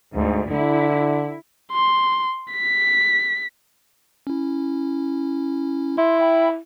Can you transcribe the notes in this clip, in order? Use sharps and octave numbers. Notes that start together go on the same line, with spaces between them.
D2 G#2
D3 E4
C6
B6
C#4 E4
E4 C6
E5 G5 B5